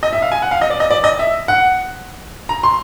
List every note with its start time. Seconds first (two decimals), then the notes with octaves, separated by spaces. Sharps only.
0.03 D#5
0.13 E5
0.22 F5
0.32 G#5
0.42 F#5
0.51 F5
0.62 D#5
0.70 D5
0.80 D#5
0.90 D5
1.04 D#5
1.19 E5
1.48 F#5
2.49 A#5
2.63 C6